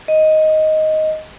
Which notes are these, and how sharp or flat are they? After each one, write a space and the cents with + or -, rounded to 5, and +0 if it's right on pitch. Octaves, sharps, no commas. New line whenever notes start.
D#5 +5